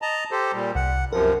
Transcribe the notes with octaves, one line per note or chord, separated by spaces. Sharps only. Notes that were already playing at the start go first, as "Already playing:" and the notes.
D#5 A5 A#5
G4 A4 C5
A#2 G3
C2 F#5
F#2 C3 F3 A#4